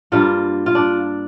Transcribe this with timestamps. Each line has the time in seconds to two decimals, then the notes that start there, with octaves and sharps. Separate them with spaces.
0.12 G2 G3 A#3 F4
0.66 F4
0.75 D4